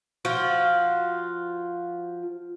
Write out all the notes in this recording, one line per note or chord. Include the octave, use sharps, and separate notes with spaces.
F3 F4 F#4